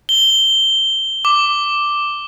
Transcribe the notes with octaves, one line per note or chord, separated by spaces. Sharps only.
G7
D6